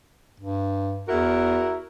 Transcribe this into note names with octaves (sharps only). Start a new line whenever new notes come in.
G2
E2 E4 F#4 A#4